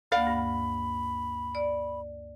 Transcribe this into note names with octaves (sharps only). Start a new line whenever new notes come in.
D2 A#3 D5 F5 F#5 B5
G2
D5